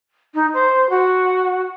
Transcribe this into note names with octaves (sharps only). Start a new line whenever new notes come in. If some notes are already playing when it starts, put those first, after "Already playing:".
D#4
C5
F#4